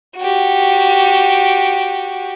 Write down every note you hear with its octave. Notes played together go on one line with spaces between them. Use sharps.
F#4 G4